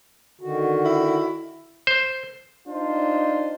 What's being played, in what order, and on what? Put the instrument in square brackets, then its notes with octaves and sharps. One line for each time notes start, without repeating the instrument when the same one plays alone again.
[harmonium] D3 D#3 F#4
[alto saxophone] E4
[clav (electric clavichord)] C5
[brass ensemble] D4 D#4 F4 C5